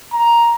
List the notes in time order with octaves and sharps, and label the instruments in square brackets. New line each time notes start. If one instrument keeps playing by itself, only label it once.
[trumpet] A#5